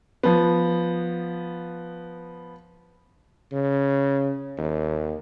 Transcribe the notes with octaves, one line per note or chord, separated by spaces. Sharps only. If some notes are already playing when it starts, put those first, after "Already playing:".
F3 B3
C#3
D#2